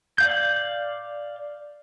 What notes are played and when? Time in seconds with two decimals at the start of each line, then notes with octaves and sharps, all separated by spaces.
0.18 D5 F5 G6